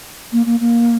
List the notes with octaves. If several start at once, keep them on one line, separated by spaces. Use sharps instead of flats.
A#3
A#3
A#3